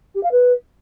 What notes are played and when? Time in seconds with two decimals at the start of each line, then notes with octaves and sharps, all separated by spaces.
0.15 G4
0.23 F5
0.31 B4